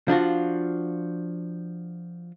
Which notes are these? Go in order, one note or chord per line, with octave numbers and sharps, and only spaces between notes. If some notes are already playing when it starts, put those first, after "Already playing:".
F3 D4 F4 F#4